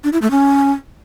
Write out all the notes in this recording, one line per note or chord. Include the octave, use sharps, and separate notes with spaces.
D4
E4
A3
C#4